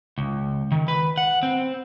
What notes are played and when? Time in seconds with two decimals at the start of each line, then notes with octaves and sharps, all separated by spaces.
0.18 C#2
0.72 D#3
0.88 B4
1.17 F#5
1.43 C4